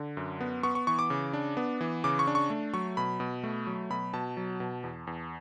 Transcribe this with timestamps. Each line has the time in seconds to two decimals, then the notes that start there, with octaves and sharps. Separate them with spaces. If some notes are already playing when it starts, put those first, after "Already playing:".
Already playing: D3
0.17 F#2
0.40 B3
0.63 B3 C#6
0.75 C#6
0.87 E3 C#6
0.99 D6
1.10 C#3
1.33 D4
1.57 B3
1.81 E3
2.04 C#3 D6
2.19 C#6
2.27 D4
2.35 C#6
2.50 A3
2.74 F#3 C#6
2.97 B2 B5
3.20 B2
3.44 A3
3.67 F#3
3.90 B2 B5
4.14 B2 A5
4.37 F#3
4.60 B2
4.84 E2
5.07 E2